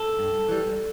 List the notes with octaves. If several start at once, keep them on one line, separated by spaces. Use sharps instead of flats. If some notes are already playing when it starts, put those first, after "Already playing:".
Already playing: A4
G2
E3 G3